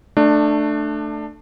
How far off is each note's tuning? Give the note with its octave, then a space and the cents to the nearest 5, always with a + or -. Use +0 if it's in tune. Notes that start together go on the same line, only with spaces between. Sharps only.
A3 +0 D4 +20